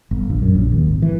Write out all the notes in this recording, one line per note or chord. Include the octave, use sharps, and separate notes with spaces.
G1
A#1
F#2
A#1
D#2
G#1
E3